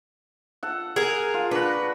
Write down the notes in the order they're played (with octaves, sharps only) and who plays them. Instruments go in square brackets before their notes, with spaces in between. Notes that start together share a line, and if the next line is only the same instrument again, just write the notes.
[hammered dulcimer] A4 F#5
[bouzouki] G#4 A#4
[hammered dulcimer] F4
[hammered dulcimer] D4 F#4 [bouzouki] B4